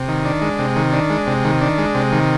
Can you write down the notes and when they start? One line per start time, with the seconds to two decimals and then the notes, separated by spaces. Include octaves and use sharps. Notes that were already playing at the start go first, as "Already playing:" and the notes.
Already playing: C3
0.08 D#3
0.25 D4
0.42 G#3
0.59 C3
0.76 D#3
0.93 D4
1.10 G#3
1.27 C3
1.44 D#3
1.61 D4
1.78 G#3
1.95 C3
2.12 D#3